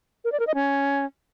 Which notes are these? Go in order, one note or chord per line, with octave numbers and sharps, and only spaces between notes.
A#4
D5
A#4
D#5
C#4